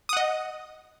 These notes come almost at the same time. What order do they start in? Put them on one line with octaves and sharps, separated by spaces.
D#6 F#5 D#5